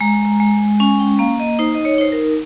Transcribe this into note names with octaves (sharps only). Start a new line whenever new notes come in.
G#3 A#5
G#3
C#4 G#5
G5
A#3 F5
D#5
D#4 C5
D#5
C#5
D#4 C5
A#4